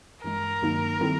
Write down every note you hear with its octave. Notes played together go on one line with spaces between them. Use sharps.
G2 E3 G#3 A#4
G2 D#3 F#3 A#3 D#4
D#3 G3 C4 E4 A4